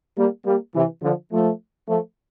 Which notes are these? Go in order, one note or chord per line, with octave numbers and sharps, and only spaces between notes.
G3 A#3
G3 A#3
C3 E3
D3 F3
F3 A3
F3 A3